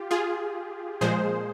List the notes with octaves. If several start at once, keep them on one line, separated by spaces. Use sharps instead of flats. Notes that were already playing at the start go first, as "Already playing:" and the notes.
Already playing: F4 G4
F4 G#4
A#2 F3 G#3 G#4 C5